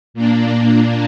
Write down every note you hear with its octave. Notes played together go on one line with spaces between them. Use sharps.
A#2 A#3 D4